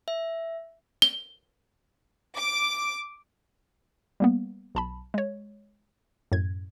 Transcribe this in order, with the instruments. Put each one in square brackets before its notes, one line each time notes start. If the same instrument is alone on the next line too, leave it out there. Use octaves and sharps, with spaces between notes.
[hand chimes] E5
[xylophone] G7
[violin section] D6
[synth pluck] G3 A#3 B3
B1 A5 B5
G#3 C#5
F#2 A2 G#6